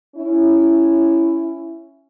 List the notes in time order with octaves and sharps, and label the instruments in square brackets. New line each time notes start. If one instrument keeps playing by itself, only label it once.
[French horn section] C#4 E4